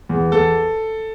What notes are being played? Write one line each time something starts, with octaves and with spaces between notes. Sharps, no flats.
E2
E2 A4